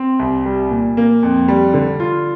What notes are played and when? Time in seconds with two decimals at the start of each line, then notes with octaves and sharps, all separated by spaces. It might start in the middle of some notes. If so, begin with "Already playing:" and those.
Already playing: C4
0.19 C2
0.46 G3
0.71 A#2
0.97 A#3
1.23 F2
1.48 G3
1.74 D3
2.00 F4